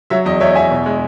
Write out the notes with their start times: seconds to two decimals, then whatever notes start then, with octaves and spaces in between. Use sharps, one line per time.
0.10 F#3 C#5 E5
0.25 E2 D#5
0.40 E2 C#5 E5
0.56 E2 E5 G#5
0.71 B2
0.86 G#3